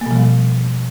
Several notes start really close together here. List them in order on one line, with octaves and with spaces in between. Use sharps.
A#3 B2 F3 G3